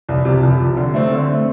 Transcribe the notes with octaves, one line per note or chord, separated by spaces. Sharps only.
C2
C3 F3
C2
C3 F3
D3
A3 C4
D3
A3 C4